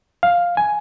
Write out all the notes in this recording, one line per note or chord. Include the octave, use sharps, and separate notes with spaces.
F5
G#5